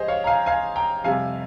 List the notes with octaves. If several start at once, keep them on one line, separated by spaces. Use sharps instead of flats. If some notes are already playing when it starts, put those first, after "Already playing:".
Already playing: G#2 F3 G4 G#4 C5 D#5
C#5 F5
A#5
F5 G#5
F5 G#5
G5 A#5
F2 C3 G3 F5 G#5